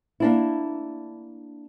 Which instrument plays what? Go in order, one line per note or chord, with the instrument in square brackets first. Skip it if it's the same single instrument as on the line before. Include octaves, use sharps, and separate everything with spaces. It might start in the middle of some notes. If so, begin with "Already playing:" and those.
[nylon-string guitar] A#3 D4 E4